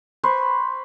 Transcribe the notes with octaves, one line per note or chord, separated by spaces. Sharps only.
B4 C5 B5 C#6